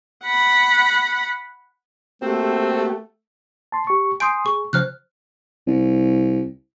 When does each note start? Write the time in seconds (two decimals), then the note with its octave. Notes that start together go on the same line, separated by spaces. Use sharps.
0.25 F#5 B5
2.22 A3 A#3 C4 F#4 G4
3.72 A5 C6
3.87 G4 C#6
4.20 G#5 C6 D#6 G6 D7
4.46 G#4 C#6
4.73 C#3 F3 C5 F6 F#6
5.67 C2